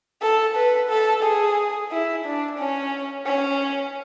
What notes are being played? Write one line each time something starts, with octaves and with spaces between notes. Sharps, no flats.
A4
B4
A4
G#4
E4
D4
C#4
C#4